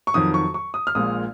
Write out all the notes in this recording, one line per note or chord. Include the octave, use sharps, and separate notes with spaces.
C#6
F2 D#3 F#3 D#6
C#6
C#6
D#6
F6
A#1 A#2 G#3 D#6